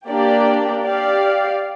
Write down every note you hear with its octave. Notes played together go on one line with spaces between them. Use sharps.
A#3 D4 G4 D5
G4 D5 F5